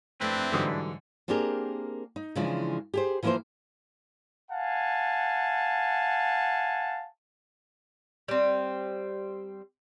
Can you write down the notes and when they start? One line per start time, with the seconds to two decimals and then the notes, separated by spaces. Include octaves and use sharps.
0.21 F2 A3 C4 D4 E4 B4
0.52 G#2 D3 E3 F#3 G3 D#6
1.28 A#3 C4 D4 G4 G#4 A#4
2.16 D#4
2.35 C#3 E3 F3 G#3 D4
2.94 G4 G#4 C5
3.23 E3 F3 A#3 E4 A#4 C5
4.51 F5 F#5 G#5 A5
8.28 G3 C4